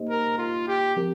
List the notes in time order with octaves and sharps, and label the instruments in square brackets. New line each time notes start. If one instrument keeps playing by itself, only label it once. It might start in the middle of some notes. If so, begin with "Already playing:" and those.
Already playing: [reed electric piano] A#3 D#4 G4 C5 D#5
[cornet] A#4
F4
G4
[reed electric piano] F3 C4 G4 A#4